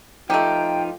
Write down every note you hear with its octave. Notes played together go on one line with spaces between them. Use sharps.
F3 A3 D#4 F4 G4 G5